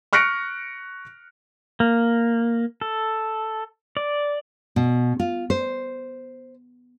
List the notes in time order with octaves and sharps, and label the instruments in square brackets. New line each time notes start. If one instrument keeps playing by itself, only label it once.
[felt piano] C#6 F6 F#6 A#6 C#7 D7
[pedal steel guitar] A#3
A4
D5
[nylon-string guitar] B2
F4
C5